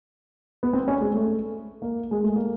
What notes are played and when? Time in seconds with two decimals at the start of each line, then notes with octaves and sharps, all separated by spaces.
0.63 B3
0.73 C4
0.88 C#4
1.01 G#3
1.14 A3
1.82 A#3
2.11 G#3
2.23 A3
2.36 A#3